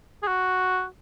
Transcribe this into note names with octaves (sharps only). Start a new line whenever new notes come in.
G#4
F#4